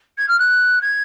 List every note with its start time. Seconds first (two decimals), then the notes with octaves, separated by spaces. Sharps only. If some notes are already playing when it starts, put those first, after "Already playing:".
0.18 G#6
0.28 F6
0.39 F#6
0.81 G#6